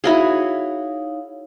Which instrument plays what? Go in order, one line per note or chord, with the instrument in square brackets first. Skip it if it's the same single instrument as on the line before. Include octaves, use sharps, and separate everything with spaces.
[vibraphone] D#4 C#5 F5 [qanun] E4 F#4 G#4